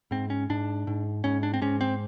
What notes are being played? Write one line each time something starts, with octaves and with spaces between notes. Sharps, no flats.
G#2 C4
C#4
G#2 D4
G#2
G#2 C#4
D4
C4
G#2 C#4
C4